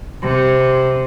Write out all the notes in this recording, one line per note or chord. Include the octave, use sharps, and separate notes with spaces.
C3